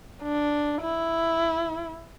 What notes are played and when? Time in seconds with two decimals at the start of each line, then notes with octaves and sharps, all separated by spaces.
0.22 D4
0.81 E4